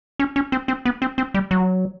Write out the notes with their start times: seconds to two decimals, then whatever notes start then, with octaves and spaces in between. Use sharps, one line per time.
0.19 C#4
0.36 C#4
0.52 C4
0.68 C4
0.85 B3
1.02 C4
1.18 C4
1.34 G3
1.51 F#3